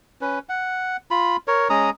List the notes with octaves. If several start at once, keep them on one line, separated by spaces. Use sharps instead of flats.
C#4 B4
F#5
F4 B5
A#4 C#5
G#3 C#4 A#5 D#6